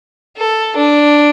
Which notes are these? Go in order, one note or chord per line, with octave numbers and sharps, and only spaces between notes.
A4
D4